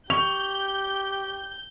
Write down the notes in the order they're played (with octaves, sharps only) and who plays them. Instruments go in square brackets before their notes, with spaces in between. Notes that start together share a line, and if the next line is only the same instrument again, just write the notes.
[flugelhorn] G4 [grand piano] C#6 [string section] G6 [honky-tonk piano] F7